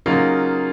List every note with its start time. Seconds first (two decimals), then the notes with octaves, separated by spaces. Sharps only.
0.06 C#3 F#3 A#3 D#4 F4